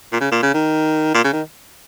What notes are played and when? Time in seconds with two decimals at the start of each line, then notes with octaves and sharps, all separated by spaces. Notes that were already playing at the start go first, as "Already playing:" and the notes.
0.12 A#2
0.21 C#3
0.32 A#2
0.43 C#3
0.54 D#3
1.14 A#2
1.24 C#3
1.33 D#3